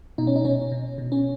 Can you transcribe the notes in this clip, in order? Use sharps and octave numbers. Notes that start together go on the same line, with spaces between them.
B2 D#4
C#4
D#4
B2 C#4
B2
B2
C#4